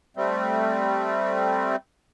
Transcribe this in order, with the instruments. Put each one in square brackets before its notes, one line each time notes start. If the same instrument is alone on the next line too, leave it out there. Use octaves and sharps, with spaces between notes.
[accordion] G3 A3 C4